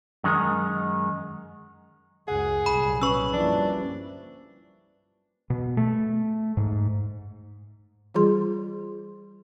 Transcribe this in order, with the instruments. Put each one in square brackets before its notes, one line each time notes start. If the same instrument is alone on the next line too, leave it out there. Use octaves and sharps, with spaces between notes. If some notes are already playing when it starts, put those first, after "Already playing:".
[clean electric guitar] F#2 D#3 G#3 D#4 A#4
[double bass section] C#2 F#2 [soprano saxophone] G#4 [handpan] F#5
[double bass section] C2 A#2 F#3 [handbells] B5
[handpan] C#4 B4 [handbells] C#6 E6
[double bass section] G1 G3 A#3 [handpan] F3 E4 [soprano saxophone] D4
[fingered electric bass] B2
A3
G#2
[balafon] E3 G3 F4 G#4 C6